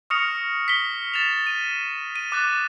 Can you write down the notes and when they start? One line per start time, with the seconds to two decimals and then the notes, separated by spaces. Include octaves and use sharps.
0.10 C#6 D#6 F6 A#6 C#7 F7
0.68 B6 G7
1.14 A6 E7 F7
1.47 D#7
2.16 D#7
2.32 D6 F#6 A6